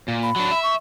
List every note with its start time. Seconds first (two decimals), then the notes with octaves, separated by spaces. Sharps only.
0.08 A#2
0.23 B5
0.36 F#3 D4
0.51 E5
0.63 C#6